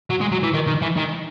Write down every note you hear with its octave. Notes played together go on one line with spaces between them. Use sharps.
F#3
G#3
F#3
E3
D#3
D#3
E3
D#3